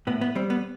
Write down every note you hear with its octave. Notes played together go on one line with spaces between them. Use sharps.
A2 B3
B3
G3 C4
B3